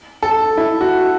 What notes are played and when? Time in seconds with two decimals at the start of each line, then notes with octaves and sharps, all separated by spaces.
0.23 A4
0.57 E4
0.81 F#4